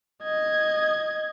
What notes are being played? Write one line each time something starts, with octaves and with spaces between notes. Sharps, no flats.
D#5 G#6